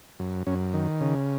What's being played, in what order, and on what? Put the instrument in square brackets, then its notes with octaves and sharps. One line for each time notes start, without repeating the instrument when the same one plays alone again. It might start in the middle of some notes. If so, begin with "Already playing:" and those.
[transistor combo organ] F#2
F#2 C#4
D#3
C#3